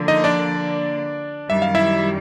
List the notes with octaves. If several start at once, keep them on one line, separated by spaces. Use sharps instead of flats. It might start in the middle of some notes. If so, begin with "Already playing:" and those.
Already playing: D3 F3 A#3
D#4 D#5
D4 D5
F#2 D#3 G3 E5
F5
E4 E5